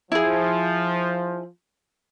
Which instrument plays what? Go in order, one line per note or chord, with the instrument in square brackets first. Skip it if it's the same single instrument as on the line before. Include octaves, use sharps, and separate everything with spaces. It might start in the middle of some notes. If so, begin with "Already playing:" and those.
[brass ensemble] F3 [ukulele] E4 G#4